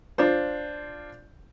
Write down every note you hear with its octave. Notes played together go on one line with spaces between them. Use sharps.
D4 F4 C5